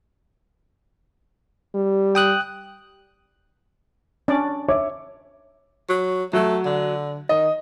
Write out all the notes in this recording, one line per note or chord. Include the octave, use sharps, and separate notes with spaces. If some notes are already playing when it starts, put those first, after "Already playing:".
G3
G5 D#6 F#6
C#4 D4 D5
C#5 E5 D6
F#3
F#3 A3
D3
D#3 D#5